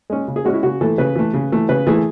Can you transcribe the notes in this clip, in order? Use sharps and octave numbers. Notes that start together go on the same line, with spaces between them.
G#3 C#4
C#3
G#4
G#3 C#4 F#4
E4
C#3 F#4
E3 A3 A4
C#3 B4
E3 A3
C#3
E3 A3
C#3 B4
E3 A3 G#4